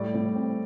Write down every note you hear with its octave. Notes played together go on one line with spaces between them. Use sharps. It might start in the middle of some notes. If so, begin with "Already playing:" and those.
Already playing: A2 G3 D5
A2
C4